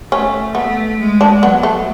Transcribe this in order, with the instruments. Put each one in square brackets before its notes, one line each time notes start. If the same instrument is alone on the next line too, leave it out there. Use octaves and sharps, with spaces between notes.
[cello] A3 [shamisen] C#4
[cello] A3 [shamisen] B3
[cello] G#3
[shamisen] D4
[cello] F#3 [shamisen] B3
[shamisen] A3